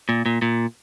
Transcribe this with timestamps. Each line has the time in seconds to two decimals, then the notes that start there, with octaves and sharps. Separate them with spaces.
0.09 A#2
0.26 A#2
0.42 A#2